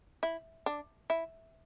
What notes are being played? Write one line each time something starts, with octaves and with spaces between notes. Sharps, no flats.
E4
D4
E4